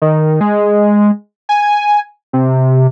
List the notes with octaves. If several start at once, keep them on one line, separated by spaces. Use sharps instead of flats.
D#3
G#3
G#5
C3